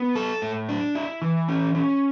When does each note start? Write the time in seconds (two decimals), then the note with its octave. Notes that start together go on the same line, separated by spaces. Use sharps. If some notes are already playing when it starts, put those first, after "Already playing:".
Already playing: B3
0.15 A4
0.42 A2
0.69 D4
0.95 E4
1.22 E3
1.48 C#4
1.74 C#4